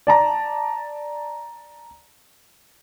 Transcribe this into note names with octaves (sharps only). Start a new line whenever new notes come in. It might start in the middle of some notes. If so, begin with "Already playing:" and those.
D5 A5 A#5